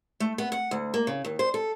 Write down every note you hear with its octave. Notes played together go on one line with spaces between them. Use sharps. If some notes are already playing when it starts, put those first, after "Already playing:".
A3
B3
F#5
D2
A#3
C#3
D#2
C5
A4